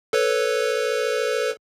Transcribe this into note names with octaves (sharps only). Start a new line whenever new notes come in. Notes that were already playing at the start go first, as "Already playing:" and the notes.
A4 B4 C#5